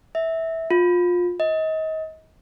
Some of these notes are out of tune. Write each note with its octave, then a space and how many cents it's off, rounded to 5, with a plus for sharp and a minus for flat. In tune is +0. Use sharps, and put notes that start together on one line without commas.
E5 -15
F4 +20
D#5 +30